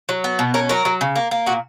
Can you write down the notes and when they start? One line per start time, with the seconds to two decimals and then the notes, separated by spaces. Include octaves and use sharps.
0.09 F#3
0.24 B3
0.39 B2
0.54 C#4 A#4
0.69 F#3 A#4
0.85 F#3
1.01 C#3
1.16 A#3
1.31 A#3
1.46 A#2 F#4